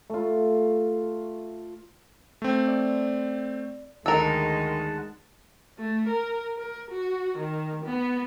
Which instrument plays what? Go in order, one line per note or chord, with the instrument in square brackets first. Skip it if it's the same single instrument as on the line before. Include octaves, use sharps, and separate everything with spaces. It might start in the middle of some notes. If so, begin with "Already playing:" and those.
[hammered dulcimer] A3 F4
[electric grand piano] A3 C4
[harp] D5
[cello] D2 D#4 [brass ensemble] D#3 G#3 [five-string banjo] A4 A#4 [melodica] F#5 A5
[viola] A3
A#4
A#4
F#4
D#3
B3